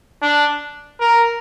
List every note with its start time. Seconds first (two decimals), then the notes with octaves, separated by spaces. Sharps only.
0.22 D4
1.00 A#4